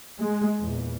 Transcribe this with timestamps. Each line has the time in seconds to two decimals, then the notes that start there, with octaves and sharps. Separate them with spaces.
0.20 G#3
0.60 E2 A#2